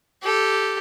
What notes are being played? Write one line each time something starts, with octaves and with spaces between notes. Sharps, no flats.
G4 A4